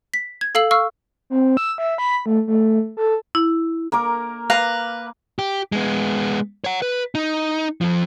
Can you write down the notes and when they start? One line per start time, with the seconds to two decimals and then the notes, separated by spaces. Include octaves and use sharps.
0.14 B6
0.41 G#6
0.55 A4 F5 E6 F#7
0.71 F5 C#6 E6 F6
1.30 C4
1.57 E6
1.78 E5
1.98 B5
2.26 A3
2.47 A3
2.97 A4
3.35 E4
3.92 A#3 A#4 D6
4.50 B4 F5 A#5
5.39 G4
5.72 G#3 B3
6.64 C#5 F#5
6.82 B4
7.15 D#4
7.81 F2 F3